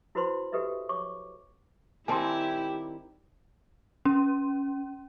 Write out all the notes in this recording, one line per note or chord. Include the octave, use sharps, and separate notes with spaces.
E4 F#4 B4 C5 B5 C6
F#4 G4 A4 B4 D#5 E5
C#5 C#6 D6
D#3 G3 C4 E4 G4 G#5 A5 C6
C#4